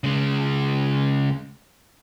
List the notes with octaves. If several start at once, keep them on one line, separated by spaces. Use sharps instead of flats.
C#3 G#3